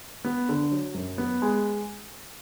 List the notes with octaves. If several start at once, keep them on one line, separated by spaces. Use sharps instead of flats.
B3
D3
F#3
F#2
B3
G#3